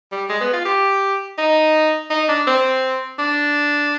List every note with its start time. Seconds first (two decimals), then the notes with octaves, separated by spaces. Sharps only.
0.12 G3
0.29 G#3
0.41 B3
0.53 F4
0.65 G4
1.38 D#4
2.10 D#4
2.29 D4
2.47 C4
3.19 D4